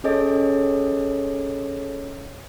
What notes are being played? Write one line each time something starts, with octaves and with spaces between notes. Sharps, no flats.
C#4 G#4 A4 C#5 D#5